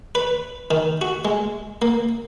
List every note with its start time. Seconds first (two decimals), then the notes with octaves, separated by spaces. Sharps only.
0.15 B4
0.71 D#3
1.01 F#4
1.25 G#3
1.82 A#3